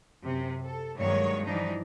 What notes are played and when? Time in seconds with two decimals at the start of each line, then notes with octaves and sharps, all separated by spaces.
0.23 F#2 C3
0.65 A4
0.97 G2 D#3 F#3 G#3 A#3 C#5
1.45 E3 F3 G3 D4 D#4